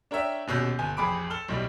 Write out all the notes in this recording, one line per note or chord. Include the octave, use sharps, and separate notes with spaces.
D4 A#4 C#5 E5 G5
D#1 B2 C#4 E6 G6
G1 G#5
A1 F2 G#4 B5 D6 D7
A4 F6 G7
B1 A2 G3